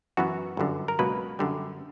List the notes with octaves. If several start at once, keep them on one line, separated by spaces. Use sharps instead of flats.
F#2 E3 B3 F#4
G1 F#2 D3
A#4
C#2 B2 F#3 A#3 B4
F#2 D3 G3